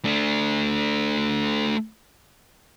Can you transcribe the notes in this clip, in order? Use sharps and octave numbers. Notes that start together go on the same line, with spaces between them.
A3 D4